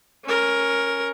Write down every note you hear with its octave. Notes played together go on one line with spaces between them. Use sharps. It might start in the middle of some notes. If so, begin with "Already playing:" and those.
C#4 A#4